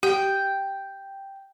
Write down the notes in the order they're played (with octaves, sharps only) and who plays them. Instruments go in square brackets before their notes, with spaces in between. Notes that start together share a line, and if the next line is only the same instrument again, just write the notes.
[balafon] G4 [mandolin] G5